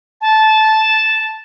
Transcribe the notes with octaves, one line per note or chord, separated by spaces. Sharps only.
A5